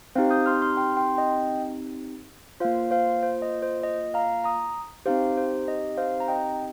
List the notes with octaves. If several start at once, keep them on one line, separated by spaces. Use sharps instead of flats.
C4 D#4 G4 C5 F5
D#6 G6
C6 F6
C6 F6
G5 C6
G5 C6
D#5 G5
A#3 F4 C5 F5
C5 F5
C5
D#5
C5
D#5
F5 A#5
A#5 D#6
C4 D#4 G4 C5 F5
C5
D#5
C5 F5
A#5
D#5 G5